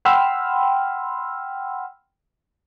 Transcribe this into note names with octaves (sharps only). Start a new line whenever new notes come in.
F#5 G5 B5 C6 E6 F6